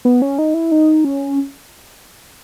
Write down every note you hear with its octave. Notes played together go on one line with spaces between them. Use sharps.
B3
C#4
D#4
E4
D#4
C#4